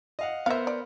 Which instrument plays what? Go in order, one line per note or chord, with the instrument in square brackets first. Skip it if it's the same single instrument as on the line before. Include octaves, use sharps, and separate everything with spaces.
[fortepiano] D#5 F5 F#5
[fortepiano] B3 A#4 C5 [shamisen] E5 F5
[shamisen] D5